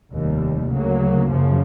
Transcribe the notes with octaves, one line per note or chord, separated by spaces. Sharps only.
F1 D#2 D#3 G3
D2 C#3 F#3 A#3
F#2 C#3 F3